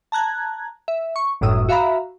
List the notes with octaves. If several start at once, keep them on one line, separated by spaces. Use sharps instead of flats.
A5 A#5 F#6 G#6
E5
C#6
G1 F#2 A2 D#6 E6
F#4 E5 F5 A#5 B5